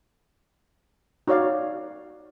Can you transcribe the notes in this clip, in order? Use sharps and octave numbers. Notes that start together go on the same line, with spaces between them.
D#4 F#4 C#5 D5 F5